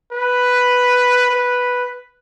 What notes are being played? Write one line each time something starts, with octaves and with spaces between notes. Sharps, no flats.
B4
B4